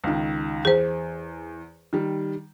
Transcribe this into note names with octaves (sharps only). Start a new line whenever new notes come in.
C#2 D#3
E2 G#4 C5
D#3 G3